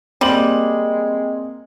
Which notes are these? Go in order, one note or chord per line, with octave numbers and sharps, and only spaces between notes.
G3 G#3 A#3 C4 F#7